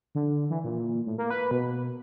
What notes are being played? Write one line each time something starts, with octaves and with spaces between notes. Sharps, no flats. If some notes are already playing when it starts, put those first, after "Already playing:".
D3
E3
A#2
A2
A#3
B4
B2